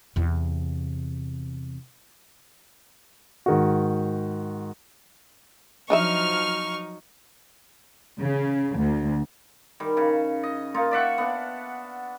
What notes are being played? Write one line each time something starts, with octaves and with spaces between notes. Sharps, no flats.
E2 C3
G#2 D#3 F#4
F3 F#3 D4 D#4 D#5 E5 C#6 F6
C#3
D2
D#3 G3
C#3
D#5
A#3 D#4 F4
D5 E5 F#5 C#6
B3 D4